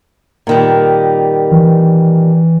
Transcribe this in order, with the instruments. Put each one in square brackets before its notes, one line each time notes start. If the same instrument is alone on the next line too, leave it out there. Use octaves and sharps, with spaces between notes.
[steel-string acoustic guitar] A#2 D#3 G3
[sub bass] E3